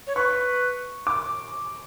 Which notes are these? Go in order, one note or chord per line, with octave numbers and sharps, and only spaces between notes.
C#5
B4 C#6
D6